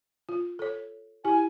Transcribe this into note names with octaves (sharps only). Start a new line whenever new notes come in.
F4
A4 C#5
E4 G4 G#5